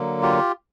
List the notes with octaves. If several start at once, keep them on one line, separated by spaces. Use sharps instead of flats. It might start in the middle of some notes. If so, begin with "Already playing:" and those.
Already playing: D3 F#3 A#3
F4 G4